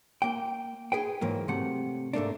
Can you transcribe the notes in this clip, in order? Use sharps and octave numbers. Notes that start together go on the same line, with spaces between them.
A#3 G5
G#4 B4 G5
G#2 E3 F#3 A#3
C3 A3 F#5
G#2 A3 A#3 D4